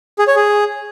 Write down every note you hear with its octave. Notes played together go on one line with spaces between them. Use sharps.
G#4
C#5
G#4